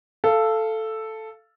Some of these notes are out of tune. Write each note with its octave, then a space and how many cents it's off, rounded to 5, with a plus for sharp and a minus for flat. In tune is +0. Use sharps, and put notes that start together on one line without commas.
A4 +0 F5 -20